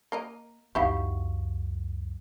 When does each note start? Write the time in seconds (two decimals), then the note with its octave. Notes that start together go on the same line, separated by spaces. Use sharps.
0.12 A#3 A#4 D#5
0.75 C#2 F#2 D#4 E4 G4 F5 F#5 C#6